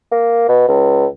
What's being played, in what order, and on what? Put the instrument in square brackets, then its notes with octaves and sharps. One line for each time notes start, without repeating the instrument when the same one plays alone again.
[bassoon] A#3
B2
C#2